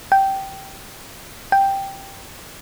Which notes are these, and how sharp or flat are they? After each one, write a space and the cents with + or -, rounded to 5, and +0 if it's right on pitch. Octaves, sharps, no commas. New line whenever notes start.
G5 -15
G5 +0